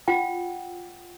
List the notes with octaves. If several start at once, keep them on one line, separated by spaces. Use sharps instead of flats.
F4 F#5 G5